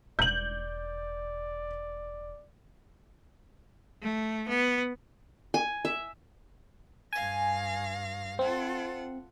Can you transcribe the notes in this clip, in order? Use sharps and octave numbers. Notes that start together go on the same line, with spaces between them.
E1 D5 G6 F#7
A3
B3
G#5
E5
G2 F5 G#5 A#6
C4 F4 A4 F#5